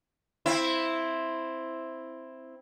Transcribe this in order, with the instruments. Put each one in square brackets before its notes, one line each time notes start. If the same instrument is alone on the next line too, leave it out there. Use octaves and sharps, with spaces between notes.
[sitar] C4 E4